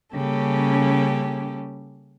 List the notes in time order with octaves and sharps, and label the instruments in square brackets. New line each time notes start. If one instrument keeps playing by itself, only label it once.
[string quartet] C#3 G3 A#3 C#4 G4 A4